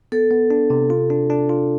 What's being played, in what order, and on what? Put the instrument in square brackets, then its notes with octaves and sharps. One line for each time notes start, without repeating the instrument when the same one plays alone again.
[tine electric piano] B3 [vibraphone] A4
[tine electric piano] B3
D4
C3
F4
D4
D4
F4